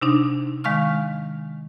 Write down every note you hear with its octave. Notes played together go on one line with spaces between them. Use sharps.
C3 D4 D#4
D#3 G#3 F5 C#6 F6